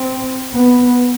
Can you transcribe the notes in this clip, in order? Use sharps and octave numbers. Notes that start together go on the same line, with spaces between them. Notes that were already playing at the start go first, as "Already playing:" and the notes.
Already playing: C4
B3